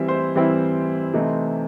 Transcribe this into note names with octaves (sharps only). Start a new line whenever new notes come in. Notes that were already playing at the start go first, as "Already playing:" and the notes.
Already playing: E3 G3 C4 E4 E5
C5 C6
E3 G3 C4 E4
C3 E3 A3 D#4